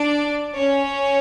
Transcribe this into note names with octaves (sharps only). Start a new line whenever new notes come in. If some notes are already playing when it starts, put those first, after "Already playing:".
Already playing: D4 D5
C#4 C#5